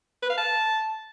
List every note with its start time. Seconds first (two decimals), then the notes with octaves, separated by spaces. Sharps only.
0.22 B4
0.30 F5
0.37 A5